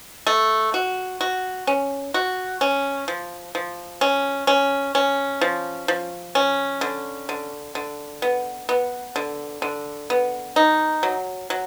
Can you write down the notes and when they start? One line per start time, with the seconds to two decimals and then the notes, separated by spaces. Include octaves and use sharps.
0.27 A3
0.74 F#4
1.21 F#4
1.67 C#4
2.14 F#4
2.61 C#4
3.08 F3
3.55 F3
4.01 C#4
4.47 C#4
4.95 C#4
5.41 F3
5.88 F3
6.35 C#4
6.81 D3
7.29 D3
7.75 D3
8.22 B3
8.69 B3
9.16 D3
9.62 D3
10.10 B3
10.56 D#4
11.03 F#3
11.50 F#3